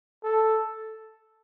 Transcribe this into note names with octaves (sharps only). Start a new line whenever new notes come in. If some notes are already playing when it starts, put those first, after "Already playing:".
A4